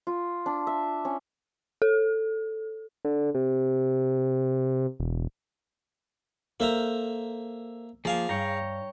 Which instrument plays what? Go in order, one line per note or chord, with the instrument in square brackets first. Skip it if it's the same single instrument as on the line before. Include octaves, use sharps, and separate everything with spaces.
[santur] F4
D4
E5
C#4
[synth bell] A4
[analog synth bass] D3
C3
E1
[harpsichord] A#3 E5 A#5 [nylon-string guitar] A4 A#4 C5
[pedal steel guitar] F3 A#3 [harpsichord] G#4 F5 G#5
[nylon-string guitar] G2 [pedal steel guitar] C#5 G5 A#5